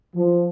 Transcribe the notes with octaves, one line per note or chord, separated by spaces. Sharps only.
F3